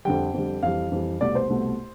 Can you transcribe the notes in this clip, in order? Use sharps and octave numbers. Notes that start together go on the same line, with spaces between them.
F2 D3 G3 G5
F2 D3 G3
F2 E3 G3 F5
F2 E3 G3
C2 B2 A3 D5
C5
C2 B2 A3